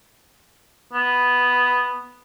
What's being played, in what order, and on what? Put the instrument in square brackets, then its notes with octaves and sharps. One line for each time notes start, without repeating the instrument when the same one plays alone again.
[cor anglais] B3